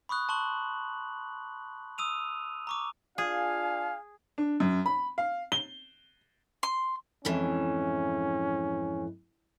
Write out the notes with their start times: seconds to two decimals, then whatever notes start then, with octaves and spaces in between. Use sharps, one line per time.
0.09 B5 C#6 D#6 F#6
0.29 A5 C6 C#6 F#7
1.98 D#6 E6 D#7 F7
2.67 A#5 C#6 D6
3.18 D4 F4 G#4 F5 G#5
4.38 D4
4.60 F#2
4.86 B5
5.18 F5
5.52 G7
6.63 C6
7.25 F2 G#2 E3 C#4